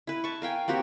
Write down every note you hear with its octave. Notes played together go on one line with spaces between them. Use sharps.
E4 B4
A5 C#6
A#4 F5 G5 G#5
A#3 C4 F#4 G4